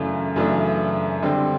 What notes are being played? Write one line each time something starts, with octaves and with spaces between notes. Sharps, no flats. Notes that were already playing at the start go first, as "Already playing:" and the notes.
Already playing: F#2 C#3 E3 A3 D4
F#2 C#3 E3 A3 D4
D3 G3 C4